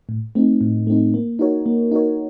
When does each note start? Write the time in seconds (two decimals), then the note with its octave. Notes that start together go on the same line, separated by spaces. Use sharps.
0.09 A2
0.35 A3 C4 D#4
0.61 A2
0.87 A3 C4 D#4
1.14 A#3
1.39 D#4 F#4 A#4 C#5
1.66 A#3
1.92 D#4 F#4 A#4 C#5